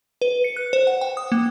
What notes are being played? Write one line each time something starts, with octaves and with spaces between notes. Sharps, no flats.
B4
C#7
F#6
C5
F#5
G5
D#6
A#3